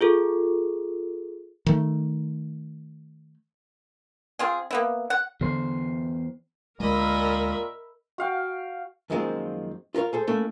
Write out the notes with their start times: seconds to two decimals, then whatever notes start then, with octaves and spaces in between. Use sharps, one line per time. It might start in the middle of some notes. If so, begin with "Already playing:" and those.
0.01 F4 G#4 A4
1.66 D#3 A3
4.39 C4 F4 G#4
4.71 A#3 B3 E4
5.10 F#5
5.41 E2 D3 C5
6.80 D2 A#2 G#3 A#4 D#5 E5 B5
8.18 F#4 F5 G5
9.10 F#2 D#3 F3 G#3 A#3 C4
9.95 F4 A#4 B4 C#5 F5
10.13 G#4 A4 C5
10.27 A3 A#3 C#4 E4 E5